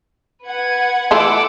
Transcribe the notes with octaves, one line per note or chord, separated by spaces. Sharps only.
B4 F#5 G#6
E3 A3 F4 F#5 D6 E6